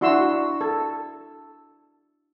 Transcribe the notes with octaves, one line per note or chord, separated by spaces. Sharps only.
D4 E4 F#4 C6 E6
A4